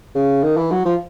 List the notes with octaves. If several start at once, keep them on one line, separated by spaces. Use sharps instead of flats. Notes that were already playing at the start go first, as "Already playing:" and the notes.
C#3
D#3
E3
F#3
F3